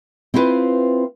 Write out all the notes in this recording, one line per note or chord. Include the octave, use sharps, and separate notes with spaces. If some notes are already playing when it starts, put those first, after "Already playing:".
C4 E4 F4 G4 B4 C5